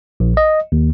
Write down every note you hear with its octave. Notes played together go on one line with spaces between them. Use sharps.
A#1
D#5
D#2